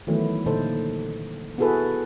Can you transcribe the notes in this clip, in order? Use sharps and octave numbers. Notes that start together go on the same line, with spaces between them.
D#3 E3 F#3 A3 B3 E4
A#2 D3 A#3 D#4 A4 C5
B3 E4 F#4 G#4 A4 B4